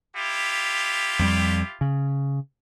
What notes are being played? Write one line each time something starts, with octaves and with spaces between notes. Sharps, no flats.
E4 F4 G4
F2 G3
C#3